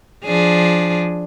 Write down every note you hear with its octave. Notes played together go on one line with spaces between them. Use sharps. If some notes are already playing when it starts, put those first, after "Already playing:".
F3 D4 G#4